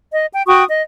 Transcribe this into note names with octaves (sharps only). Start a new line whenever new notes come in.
D#5
G5
F#4 G5 C#6 D#6
D#5